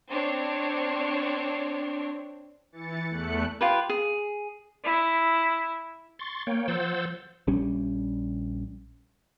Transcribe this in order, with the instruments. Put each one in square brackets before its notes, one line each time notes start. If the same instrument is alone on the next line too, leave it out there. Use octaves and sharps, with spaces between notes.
[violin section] C4 D4 C#5
[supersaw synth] E3 A6 C#7
E2 A3 F#6 C#7
[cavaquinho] F4 G4 B4
G#4
[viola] E4
[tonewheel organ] C6 C#6 A6
A#3 C#5 G5
F3 C5 F#5 E6 G6 A6
[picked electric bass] A#1 G3 C#4